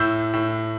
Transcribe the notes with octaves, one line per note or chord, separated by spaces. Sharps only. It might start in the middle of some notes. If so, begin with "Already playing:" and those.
Already playing: A2 E6 G6
A2